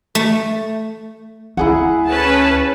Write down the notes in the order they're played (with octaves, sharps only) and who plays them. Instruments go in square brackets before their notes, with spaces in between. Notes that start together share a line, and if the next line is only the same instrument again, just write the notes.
[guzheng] A3
[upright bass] D2 [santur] E4 G#4 F#5
[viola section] C#4 B4 A5